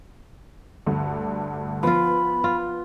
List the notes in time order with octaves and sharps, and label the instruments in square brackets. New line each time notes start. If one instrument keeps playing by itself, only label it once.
[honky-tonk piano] D2 G2 D3
[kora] F3 F4 [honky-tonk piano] B3 [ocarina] B5
[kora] F4